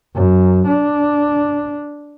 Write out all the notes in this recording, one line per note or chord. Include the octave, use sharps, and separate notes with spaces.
F#2
D4